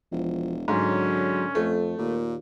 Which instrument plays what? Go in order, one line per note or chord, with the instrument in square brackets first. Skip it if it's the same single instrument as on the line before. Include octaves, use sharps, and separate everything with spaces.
[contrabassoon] E1 [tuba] F3
[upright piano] G#2 [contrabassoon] D3 [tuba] F#3 [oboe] C#4
[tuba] F2 [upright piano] A3
[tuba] D#2 [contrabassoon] A#2